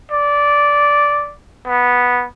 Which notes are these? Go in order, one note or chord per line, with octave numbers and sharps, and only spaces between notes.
D5
B3